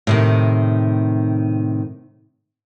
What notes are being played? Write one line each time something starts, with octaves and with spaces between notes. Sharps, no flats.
A2 C3 D#3